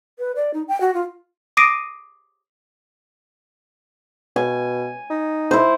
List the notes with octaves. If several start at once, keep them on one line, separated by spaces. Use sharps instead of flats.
B4
D5
D#4
G5
F#4
F4
D6 D#6 A#6 C7 D7 D#7
B2 G#5
D#4
E4 C5